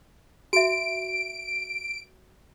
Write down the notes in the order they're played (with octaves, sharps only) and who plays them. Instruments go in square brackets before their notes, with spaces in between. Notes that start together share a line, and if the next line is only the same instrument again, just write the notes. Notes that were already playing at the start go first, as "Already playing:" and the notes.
[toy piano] F#4 E5 [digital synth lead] D7